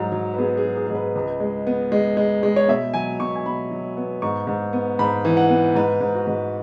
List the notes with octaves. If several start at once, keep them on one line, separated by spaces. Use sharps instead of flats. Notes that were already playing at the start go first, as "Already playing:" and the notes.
Already playing: G#2 F#3
F#3
B4
B3 G#4
G#4
F#3
G#4
G#2 G#4
B4
C#2
G#3
B3
G#3
G#3
G#3
C#5
B2 E5
F#3 G#5
B2 C#6
G#5
B2 B5
F#3
B3
G#2 C#6
G#2
B3
G#2 B5
E3
F#5
B3
G#2 B4
G#2
F#4
G#2